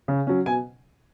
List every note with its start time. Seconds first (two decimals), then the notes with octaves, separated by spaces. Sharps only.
0.08 C#3
0.27 F#3 C#4
0.46 B2 G#5